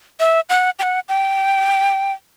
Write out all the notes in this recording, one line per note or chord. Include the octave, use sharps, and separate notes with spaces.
E5
F#5
G5
F#5
G5